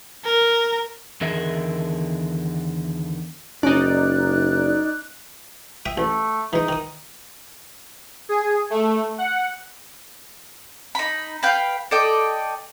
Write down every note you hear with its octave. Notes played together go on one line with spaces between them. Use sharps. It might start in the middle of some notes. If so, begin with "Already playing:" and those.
A#4
E2 D3 D#3 G#4 A#4 E5
F#1 C#4 D#4 D5 F#6
E5 G5 D#6
A1 A3
E3 G#3 D#4
D#3 D#6
G#4
A3
F#5
D#4 B5
B4 F5 G5
A4 D5 D#5 G5